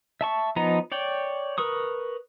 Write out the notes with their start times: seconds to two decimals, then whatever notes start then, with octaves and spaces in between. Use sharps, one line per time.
0.21 E5 A5 C#6
0.56 F3 B3 D#4 D#5 A#5
0.92 C#5 D5 G5
1.58 A#4 B4 C#6 D#6